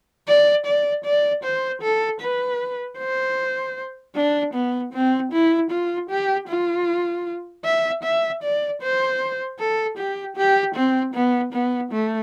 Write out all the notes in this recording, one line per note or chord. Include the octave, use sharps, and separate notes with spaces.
D5
D5
D5
C5
A4
B4
C5
D4
B3
C4
E4
F4
G4
F4
E5
E5
D5
C5
A4
G4
G4
C4
B3
B3
A3